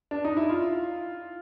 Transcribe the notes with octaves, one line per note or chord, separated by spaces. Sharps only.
D4
D#4
E4
F4